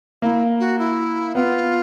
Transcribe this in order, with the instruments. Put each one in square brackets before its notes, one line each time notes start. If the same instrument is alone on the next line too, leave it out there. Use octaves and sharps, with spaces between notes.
[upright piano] A#3 [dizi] E4
[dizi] F#4
E4
[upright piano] B3 [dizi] F4